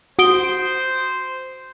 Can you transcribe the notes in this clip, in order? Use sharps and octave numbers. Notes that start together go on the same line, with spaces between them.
F#4 C5 D#6 D7 G7